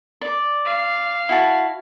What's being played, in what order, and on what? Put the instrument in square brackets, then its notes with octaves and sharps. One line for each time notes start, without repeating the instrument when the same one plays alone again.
[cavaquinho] D5
[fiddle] F5
[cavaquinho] E4 F#4 A5